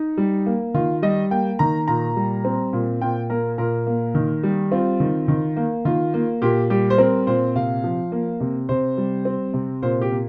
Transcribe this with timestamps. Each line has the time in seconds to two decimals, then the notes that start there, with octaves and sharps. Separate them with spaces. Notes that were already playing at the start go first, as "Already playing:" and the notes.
Already playing: D#4
0.17 G3
0.46 A#3
0.74 D#3 F4
1.02 G3 D#5
1.31 A#3 G5
1.59 D#3 A#5
1.87 A#2 A#5
2.16 G3
2.45 C4
2.73 A#2
3.01 A#2 G5
3.30 A#3 A#4
3.58 A#2 A#4
3.87 A#3
4.15 D#3
4.43 G3
4.72 C4 F4
5.00 D#3
5.28 D#3
5.57 A#3
5.85 D#3 F4
6.14 A#3
6.42 A#2 G4
6.70 G3 G4
6.90 C5
6.98 C4 A#4
7.27 A#2 C5
7.55 C3 F5
7.84 F3
8.12 A#3
8.40 C3
8.69 C3 C5
8.97 G3
9.25 C4
9.54 C3
9.82 A#2 C5
10.01 G4
10.11 A#3